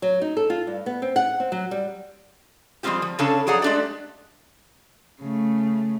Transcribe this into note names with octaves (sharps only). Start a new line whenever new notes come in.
F#3
D#4
A4
F4
G2
B3
C4
F#5
C4
F#3
G3
F3 G3 G#3 C4 F4 G4
F3
C#3 C#4 D4 A4 F5 A5
F3 F#3 G#4 D5 F#5 A#5
G#3 A3 D4 G4 D5
C#3 A3